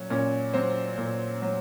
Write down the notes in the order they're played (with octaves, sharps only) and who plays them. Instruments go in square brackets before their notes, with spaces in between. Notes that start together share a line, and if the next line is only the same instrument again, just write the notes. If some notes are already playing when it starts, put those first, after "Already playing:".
Already playing: [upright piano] A#2 F#3 C#4
A#2 C#4
F#3 C4
A#2
F#3